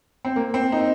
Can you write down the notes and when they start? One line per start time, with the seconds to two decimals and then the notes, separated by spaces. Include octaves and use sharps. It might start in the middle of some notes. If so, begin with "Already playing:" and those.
0.25 C4
0.36 A#3
0.54 C4
0.72 D#4